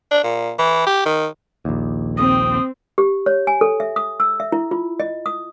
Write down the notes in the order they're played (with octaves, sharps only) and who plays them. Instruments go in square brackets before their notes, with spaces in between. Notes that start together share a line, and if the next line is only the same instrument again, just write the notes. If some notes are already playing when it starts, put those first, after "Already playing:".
[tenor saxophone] D4
A#2
E3
G4
D#3
[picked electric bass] A#1 D#2
[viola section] C4 [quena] D#6
[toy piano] G4
C#5
G#5
A4
E5
D#6
E6
E5
E4
F4
D#5
D#6